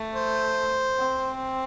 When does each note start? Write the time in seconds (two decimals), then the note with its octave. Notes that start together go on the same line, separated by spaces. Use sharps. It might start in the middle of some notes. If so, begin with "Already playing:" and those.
Already playing: A3
0.15 C5
0.98 C4